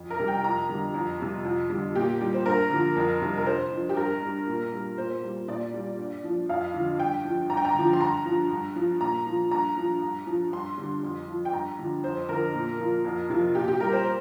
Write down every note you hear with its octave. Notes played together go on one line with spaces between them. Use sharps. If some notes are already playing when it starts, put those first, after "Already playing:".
Already playing: F2
A#4
C3 G3
G5
F2 A#5
D3 G3
F2
C3 G3
F2
D3 G3
A#2 G4
G3
C5
G2 A#4
D3 F3
F2
C3 G3
A#4
G2 C5
F3
G4
G2 A#4
G3
A#2
G3
A#2 C5
G3
A#2 D5
G3
G2
F3
F2 F5
D3 F3
G2 G5
F3
G2 A#5
G5
A#5
D3 F3
C6
G2 A#5
F3
G2
F3
A#2 A#5
F3
G2 A#5
F3
G2
F3
G2 C6
D3 G3
F2
F3
G5
G2 A#5
D3 F3
F2 C5
D3 F3 A#4
A#2
F3
F2
C3 F3
A#2 G4
G4
G3 A#4
C5